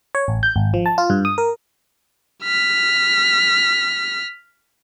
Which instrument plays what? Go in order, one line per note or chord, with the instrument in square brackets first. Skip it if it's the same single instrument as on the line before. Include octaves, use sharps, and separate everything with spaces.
[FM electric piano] C#5
A1
G6
G#1
F3
A5
F4
G2
D#6
A#4
[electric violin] F6 B6